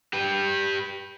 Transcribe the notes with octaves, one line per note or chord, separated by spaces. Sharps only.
G4 B4